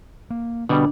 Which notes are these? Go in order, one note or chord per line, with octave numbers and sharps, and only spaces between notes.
A#3
B2 D3 G3 D4